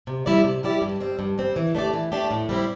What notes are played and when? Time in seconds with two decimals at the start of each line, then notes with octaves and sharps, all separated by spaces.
0.07 C3
0.26 G3 E4 G4 D5
0.44 C3
0.63 G3 E4 G4 D5
0.82 G2
1.01 G3 C4
1.19 G2
1.38 G3 C4
1.56 E3
1.75 A3 D4 G4 D5
1.93 E3
2.12 A3 D4 G4 D5
2.31 A2
2.49 G3 C4 E4